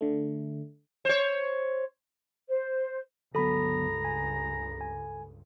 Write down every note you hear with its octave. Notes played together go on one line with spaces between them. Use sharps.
D3 A3
C5 C#5
C5
C#2 G2 D3 F#3 B3 A4 A#5 B5
G#5
G#5